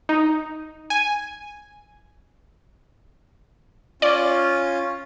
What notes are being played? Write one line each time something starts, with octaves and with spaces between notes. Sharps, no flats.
D#4
G#5
C#4 F4 D5